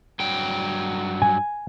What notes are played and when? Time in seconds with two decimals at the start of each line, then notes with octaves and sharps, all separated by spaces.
0.20 G2 F#3 G5
1.22 G#5